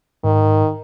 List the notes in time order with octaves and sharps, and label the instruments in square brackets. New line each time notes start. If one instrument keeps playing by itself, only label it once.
[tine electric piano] G#2 [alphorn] D#3